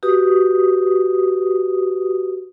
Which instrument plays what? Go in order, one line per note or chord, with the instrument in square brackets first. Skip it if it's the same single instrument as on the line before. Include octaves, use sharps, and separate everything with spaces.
[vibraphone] F#4 G4 B4 D#6